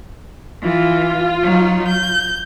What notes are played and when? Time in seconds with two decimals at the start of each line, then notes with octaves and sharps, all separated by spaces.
0.63 E3 F4
1.44 F#3 D#4
1.86 G6